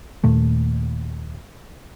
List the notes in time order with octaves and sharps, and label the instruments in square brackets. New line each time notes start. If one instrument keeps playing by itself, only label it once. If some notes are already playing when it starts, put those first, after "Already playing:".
[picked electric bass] D#2 A#2 A3